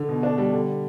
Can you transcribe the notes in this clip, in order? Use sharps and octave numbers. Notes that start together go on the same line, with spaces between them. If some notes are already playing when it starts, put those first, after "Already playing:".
Already playing: D3
B2
D4
G3
D3